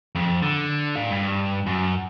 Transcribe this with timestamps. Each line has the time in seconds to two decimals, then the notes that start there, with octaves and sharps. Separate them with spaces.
0.15 F2
0.42 D3
0.96 D5 F5
1.11 G2
1.67 F#2